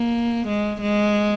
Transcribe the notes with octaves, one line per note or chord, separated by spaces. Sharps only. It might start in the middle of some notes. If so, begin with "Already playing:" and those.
Already playing: A#3
G#3
G#3